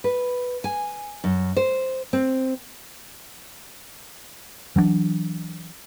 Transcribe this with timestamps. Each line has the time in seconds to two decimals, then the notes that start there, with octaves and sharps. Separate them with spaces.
0.04 B4
0.64 G#5
1.24 F#2
1.57 C5
2.13 C4
4.76 E3 F#3 A#3 D4